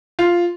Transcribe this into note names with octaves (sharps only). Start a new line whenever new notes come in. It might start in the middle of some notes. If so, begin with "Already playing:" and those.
F4